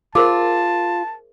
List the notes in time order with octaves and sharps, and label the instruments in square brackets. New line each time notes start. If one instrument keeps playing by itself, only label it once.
[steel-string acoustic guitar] F4 [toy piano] G#4 A#4 C5 [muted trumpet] A5